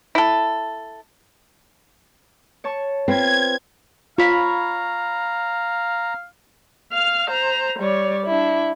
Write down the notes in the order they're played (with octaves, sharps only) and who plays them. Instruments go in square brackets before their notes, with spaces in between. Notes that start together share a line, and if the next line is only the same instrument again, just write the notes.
[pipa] E4 A4
[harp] C#5 A5 C#6
[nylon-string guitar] C4 F4 B4 [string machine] G#6
[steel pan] F4 [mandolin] C#5 B5 [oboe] F5 [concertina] A#5
[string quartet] F5 F6
C5 A#5
G3 C#5 D5
D4 E4